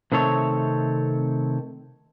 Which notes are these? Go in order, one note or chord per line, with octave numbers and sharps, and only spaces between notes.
C3 D#3 A3 C4 A4 C#5